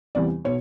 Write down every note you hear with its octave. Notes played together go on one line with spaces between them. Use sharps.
E2 C3 E3 G3 D5
B2 C#5